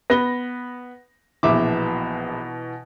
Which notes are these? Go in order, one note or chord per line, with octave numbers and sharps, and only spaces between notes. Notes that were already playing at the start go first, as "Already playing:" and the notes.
B3 B4 A#6 G7
A#1 B2 E3 E5 D6